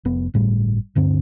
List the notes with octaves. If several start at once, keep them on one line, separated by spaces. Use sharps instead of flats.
F1 B3
G1 A2 G3
D1 G2 D3 C4